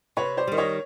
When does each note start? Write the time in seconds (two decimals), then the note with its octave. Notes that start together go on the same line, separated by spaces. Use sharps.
0.17 C3 B4 C#5
0.37 C5 D5
0.47 D#3 G3
0.57 C#5 D#5